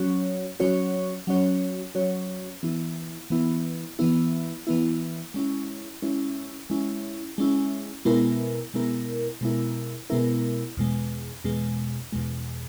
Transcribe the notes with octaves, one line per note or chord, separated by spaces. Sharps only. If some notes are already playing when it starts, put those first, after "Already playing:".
Already playing: F#3 C#4 F#4 C#5
F#3 C#4 F#4 C#5
F#3 C#4 F#4 C#5
F#3 C#4 F#4 C#5
E3 B3 E4
E3 B3 E4
E3 B3 E4
E3 B3 E4
G#3 C#4 E4
G#3 C#4 E4
G#3 C#4 E4
G#3 C#4 E4
B2 G#3 B3 E4 A#4
B2 G#3 B3 E4 A#4
B2 G#3 B3 E4 A#4
B2 G#3 B3 E4 A#4
E2 B2 G#3
E2 B2 G#3
E2 B2 G#3